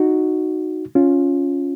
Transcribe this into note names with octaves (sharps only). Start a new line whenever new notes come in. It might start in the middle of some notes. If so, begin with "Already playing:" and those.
Already playing: D#4 F#4
C#4 F4